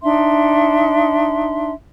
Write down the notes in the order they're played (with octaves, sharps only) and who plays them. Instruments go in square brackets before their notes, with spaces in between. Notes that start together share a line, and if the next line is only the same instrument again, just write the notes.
[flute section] D4 D#4 E5 C6